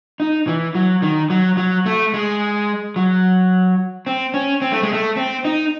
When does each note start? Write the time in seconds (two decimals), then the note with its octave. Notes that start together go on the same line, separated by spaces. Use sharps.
0.20 D#4
0.47 E3
0.75 F#3
1.02 D#3
1.30 F#3
1.57 F#3
1.86 A3
2.14 G#3
2.96 F#3
4.07 C4
4.34 C#4
4.62 C4
4.72 A3
4.83 G#3
4.93 A3
5.17 C4
5.45 D#4